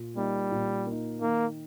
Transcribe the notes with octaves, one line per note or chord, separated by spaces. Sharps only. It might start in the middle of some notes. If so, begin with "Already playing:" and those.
Already playing: A#2
G3 A#3 D#4
A#2
A#3 D#4
D#3 A#3